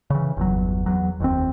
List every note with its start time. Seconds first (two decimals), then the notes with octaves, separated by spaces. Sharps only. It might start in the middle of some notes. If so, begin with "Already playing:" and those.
0.10 C#3 E3
0.37 G1 E2 F#3
0.86 E2 F#3
1.20 F1 D#2 C4